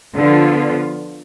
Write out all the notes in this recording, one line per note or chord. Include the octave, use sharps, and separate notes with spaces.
D3 F3 B3 F4